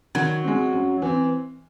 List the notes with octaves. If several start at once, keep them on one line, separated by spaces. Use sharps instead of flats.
D#3 F#3
G#3 C4
F#2
E3 C4